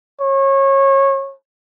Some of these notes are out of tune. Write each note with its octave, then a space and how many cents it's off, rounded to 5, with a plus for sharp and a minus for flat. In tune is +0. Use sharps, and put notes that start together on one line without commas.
C#5 -25